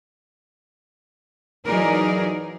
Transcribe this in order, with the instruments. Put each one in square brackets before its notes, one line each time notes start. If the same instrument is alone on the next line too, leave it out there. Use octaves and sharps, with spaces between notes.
[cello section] E3 F#3 D#4 G#4 A#4 D5